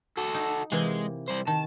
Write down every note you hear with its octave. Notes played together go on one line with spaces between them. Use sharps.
F#4 A4
D#4
C3 E3 G#3 A#3
G3 C5
D#3 A5